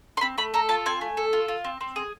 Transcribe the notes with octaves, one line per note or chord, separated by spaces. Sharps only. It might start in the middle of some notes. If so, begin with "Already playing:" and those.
C6
C4 B5
A3 B5
A4 A#5
F4 A5
C4 G#5
A3
A4
F4
F4
C4
C4
G#4